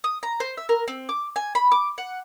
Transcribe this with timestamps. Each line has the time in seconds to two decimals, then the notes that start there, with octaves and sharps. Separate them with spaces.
0.04 D#6
0.23 A#5
0.40 C5
0.57 E5
0.69 A#4
0.88 C4
1.09 D6
1.36 G#5
1.55 B5
1.72 D6
1.98 F#5